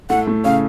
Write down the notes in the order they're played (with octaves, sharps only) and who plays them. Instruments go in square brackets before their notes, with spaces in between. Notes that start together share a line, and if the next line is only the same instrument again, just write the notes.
[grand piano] A2 A3 [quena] F#5
[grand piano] A2 A3
[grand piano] C#3 C#4 [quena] F5